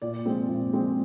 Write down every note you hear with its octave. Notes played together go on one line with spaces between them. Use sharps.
A#2 D5
F3 G#3 C4
A#2
F3 G#3 C4